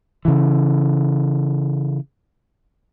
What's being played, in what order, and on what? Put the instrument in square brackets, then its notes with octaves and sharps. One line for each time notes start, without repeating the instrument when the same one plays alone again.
[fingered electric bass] C#3 E3